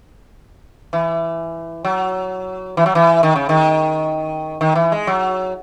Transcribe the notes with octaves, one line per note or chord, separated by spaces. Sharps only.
E3
F#3
E3
F#3
E3
D#3
C#3
D#3
D#3
E3
G#3
F#3